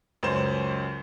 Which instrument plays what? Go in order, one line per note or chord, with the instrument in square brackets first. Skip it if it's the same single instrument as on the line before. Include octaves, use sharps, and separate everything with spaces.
[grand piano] C#2 F#2 C#4 C5 E7